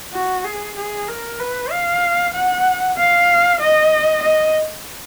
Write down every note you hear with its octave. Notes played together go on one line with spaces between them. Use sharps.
F#4
G#4
G#4
A#4
B4
F5
F#5
F5
D#5
D#5